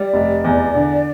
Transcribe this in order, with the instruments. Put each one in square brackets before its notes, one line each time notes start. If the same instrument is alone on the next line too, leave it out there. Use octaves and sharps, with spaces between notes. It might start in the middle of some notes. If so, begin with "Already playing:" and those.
Already playing: [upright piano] G3 [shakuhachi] D5
[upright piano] F1
E2
D3